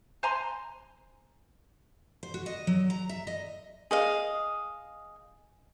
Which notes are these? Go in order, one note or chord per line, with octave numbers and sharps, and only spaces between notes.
C5 G#5 A#5 C6
C5
F#4
D#5
F#3
A#5
E5
D#5
G#4 D#5 F5